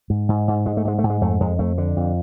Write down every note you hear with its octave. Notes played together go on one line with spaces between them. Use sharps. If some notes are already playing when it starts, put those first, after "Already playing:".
G#2
G#2
G#2
G#2 G#3
A3
G#2 G#3
A3
G#2
G#3
F2 A3
F2 G#3
F2 A3
D3
F2